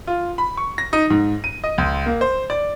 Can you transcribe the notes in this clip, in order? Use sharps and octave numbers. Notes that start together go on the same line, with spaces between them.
F4
B5
C#6
A#6
D#4
G#2
D#7
D#5
C#2
A#3
C5
D5